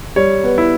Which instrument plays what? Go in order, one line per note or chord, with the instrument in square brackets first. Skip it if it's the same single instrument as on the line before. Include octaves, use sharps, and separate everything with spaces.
[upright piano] G3 [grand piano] C#5
[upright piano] B3
[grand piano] E4